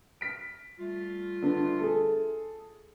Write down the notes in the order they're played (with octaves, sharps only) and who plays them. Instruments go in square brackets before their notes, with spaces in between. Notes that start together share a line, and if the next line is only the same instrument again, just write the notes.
[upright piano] F6 B6 D7
[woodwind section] G3 A3 F4
[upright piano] D3 B3 D4
G#4 A4